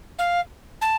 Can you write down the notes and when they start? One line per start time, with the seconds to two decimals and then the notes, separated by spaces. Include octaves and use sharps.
0.19 F5
0.81 A5